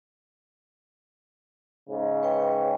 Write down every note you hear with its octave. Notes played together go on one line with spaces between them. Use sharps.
G#2 C#3
B4 C#5 G5